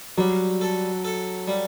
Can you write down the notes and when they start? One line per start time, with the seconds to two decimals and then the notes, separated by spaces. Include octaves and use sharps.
0.18 F#3 G3
0.61 A4
1.05 A4
1.48 G3